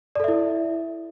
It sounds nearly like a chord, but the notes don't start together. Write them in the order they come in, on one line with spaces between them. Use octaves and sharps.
D5 A4 E5 E4